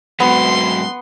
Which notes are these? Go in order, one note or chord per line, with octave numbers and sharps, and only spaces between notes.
G#2 F#3 B3 C6